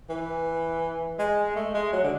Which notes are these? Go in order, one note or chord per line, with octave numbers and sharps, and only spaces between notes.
E3
G#3
A3
G#3
F#3
D3